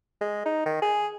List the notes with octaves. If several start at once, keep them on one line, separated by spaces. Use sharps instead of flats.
G#3
D#4
D#3
G#4